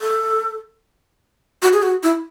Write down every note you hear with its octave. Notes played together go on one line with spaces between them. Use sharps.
A4
F#4
G#4
F#4
E4